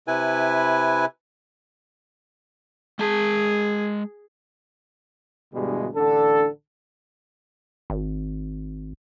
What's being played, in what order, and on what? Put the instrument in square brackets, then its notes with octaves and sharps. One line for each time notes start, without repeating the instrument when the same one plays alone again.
[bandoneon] C3 E4 B4 G#5
[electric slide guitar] G#3 A5 [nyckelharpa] G#4
[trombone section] D2 G2 B2 E3 G3 G#3
A1 D3 D4 A4
[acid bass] G#1